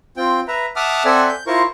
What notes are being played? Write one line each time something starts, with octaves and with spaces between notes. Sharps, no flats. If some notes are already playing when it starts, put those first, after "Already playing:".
C4 F4 G5
B4 E5 A#5
E5 F#5 A5 D6 D#6 F6
C4 A4 D5 E5 F#5 G#5
G6
E4 F4 A#4 C5 C#6